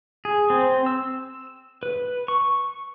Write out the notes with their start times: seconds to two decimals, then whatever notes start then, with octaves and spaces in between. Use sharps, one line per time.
0.25 G#4
0.50 C4
0.86 E6
1.83 B4
2.28 C#6